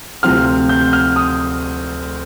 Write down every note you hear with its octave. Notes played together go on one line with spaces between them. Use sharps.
D2 C3 F3 C4 F6
G6
F6
D#6